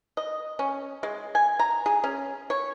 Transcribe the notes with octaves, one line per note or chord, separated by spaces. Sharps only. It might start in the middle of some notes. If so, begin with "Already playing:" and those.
D#5
C#4
G#3
G#5
A#5
G#4
C#4
C#5